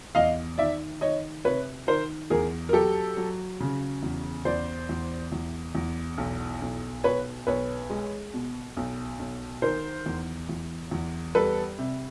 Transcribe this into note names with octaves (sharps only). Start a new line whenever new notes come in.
E2 D#5 F5
D#3 D5 E5
D#3 C#5 D#5
C3 B4 C#5
D#3 A#4 C5
E2 G#4 A#4
A#4
F#3 G4 A4
F#3
C#3
E2
E2 C5 D5
E2
E2
E2
B1
B1
B1 B4 C#5
B1 B4 C#5
G#3
B2
B1
B1
D#3 A#4 C5
E2
E2
E2
G3 A4 B4
C3